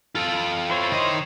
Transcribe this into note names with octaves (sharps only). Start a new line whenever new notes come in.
F4 A4
E4 C5 C#5
D#3 D#5